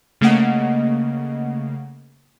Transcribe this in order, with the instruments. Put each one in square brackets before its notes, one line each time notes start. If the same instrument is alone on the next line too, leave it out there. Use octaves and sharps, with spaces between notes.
[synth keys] C#3 A3 A#3 D#5 F#5